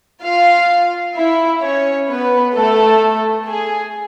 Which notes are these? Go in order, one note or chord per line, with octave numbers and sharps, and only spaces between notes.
F4 F5
E4 E5
C#4 C#5
B3 B4
A3 A4
G#4